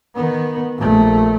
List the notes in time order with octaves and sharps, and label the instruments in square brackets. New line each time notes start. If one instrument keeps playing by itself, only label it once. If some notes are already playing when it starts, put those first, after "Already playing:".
[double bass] D#3 B3
A#1 A3